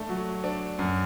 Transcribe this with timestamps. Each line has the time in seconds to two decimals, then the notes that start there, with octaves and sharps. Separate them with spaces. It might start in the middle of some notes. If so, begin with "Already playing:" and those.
Already playing: A3 D4
0.09 F#3
0.44 D4
0.79 F#2